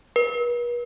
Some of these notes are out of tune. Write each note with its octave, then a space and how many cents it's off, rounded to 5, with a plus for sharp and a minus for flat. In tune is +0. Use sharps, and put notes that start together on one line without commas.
B4 -45